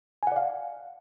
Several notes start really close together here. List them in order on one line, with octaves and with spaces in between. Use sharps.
G#5 F#5 D5 F5